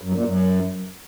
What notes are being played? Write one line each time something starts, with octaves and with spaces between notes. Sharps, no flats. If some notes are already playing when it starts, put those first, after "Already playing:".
F#2
A#2
F#2